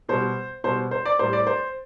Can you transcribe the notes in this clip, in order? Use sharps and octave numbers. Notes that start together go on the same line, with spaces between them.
B2 G3 C5
B2 G3 C5
C5
D5
A2 G3 C5
D5
C5